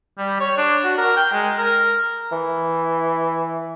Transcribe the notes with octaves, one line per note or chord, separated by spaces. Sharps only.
G3
C#5
D4
F#4
A#4
G5
G#3
A#4
E3